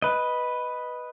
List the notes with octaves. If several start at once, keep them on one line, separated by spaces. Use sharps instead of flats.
B4 D#5